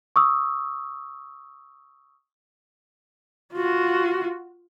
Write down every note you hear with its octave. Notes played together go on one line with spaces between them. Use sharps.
C#6 D#6 E6
F4 F#4